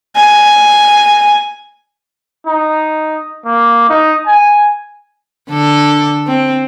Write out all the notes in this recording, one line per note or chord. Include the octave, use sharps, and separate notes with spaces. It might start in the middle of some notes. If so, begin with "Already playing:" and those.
G#5
D#4
A#3
D#4
G#5
D3 A4
C4